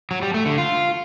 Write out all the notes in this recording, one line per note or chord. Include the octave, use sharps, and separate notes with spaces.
F#3
G3
A3
D3
F4